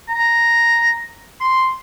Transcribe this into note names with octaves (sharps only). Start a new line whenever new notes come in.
A#5
C6